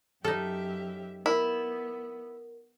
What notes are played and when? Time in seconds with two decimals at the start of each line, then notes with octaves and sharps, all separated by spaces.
0.25 F#2 D#4 G4 A4 E5 F6
1.26 B3 E4 A#4